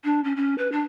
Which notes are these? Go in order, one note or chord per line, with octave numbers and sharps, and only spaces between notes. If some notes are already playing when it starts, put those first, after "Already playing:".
D4
C#4
C#4
B4
D4